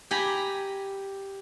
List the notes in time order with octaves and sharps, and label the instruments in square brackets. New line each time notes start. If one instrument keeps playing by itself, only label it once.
[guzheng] G4 G#5 A#5 B5